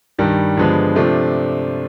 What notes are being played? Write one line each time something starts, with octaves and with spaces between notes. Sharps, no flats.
G2 D#3 G3
G2 D3 F3 G#3 B3
C3 F3 A3 D4